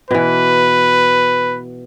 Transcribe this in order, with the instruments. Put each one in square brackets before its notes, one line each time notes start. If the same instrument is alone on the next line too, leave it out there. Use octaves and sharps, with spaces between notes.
[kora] B2 E3 [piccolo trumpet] B4